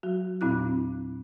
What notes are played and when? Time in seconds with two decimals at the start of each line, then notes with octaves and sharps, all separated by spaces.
0.03 F#3 F#4
0.41 E2 A#2 C4 E4 F#6